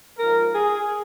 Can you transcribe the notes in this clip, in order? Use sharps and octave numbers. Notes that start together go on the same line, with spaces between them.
G#2 F3 A#4
G#4